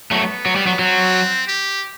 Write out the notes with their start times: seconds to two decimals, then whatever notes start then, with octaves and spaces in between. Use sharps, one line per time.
0.11 F#3 A3 B3
0.46 F#3
0.56 G3
0.67 F#3
0.79 F#3 C4
1.48 G4